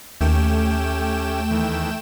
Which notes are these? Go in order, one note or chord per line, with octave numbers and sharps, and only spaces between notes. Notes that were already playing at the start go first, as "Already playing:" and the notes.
D#2 A3 C#4 G4 G5 E7
E2 D#3 E3